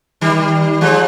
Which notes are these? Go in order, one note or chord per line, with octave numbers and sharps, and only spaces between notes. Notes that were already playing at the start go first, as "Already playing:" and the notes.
D#3 G3
F3 G#3